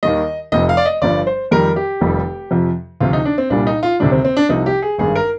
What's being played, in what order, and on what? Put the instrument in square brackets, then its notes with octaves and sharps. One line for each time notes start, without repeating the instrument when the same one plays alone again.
[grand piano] D#2 D#3 G3 D#5
F1 F2 C3 D#5
F5
D5
D#5
G1 G2 F3 D5
C5
F2 D#3 G3 A#4
G4
F1 F2 D#3 G3
F2 C3 F3
D2 C3 F3 F4
D#4
D4
C4
C2 A#2 G3 D4
D#4
F4
D2 C3 D#3 G3 D4
C4
C4
D4
C2 C3 F3 D#4
G4
G#4
G#1 G2 D#3 G#4
A#4